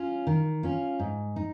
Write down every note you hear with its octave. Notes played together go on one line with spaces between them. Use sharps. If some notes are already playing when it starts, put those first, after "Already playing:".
Already playing: C#4 F4
D#3
C#4 F4
G#2
D#4